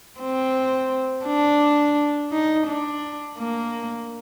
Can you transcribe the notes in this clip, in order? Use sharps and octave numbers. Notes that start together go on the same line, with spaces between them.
C4
D4
D#4
D4
A#3